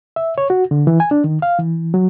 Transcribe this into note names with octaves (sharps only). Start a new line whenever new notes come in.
E5
C#5
F#4
D3
E3
G#5
D4
D#3
F5
E3
F#3